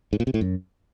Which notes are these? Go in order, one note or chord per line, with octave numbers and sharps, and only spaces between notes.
G#2
A#2
C3
A2
F#2